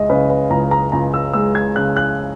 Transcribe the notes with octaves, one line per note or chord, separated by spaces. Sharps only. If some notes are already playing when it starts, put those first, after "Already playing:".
Already playing: C#2 G#3 D#5 E5
C#3 B4
B4
C#2 A#5
A#5
C#2 A#5
E6
G#3 E6
G#6
C#3 F#6
F#6